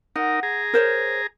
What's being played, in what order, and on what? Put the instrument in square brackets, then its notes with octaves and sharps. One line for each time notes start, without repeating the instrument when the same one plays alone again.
[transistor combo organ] D#4 A#4 [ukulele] F#5
[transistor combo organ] G#4 A#5
[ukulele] A#4 C5 C#5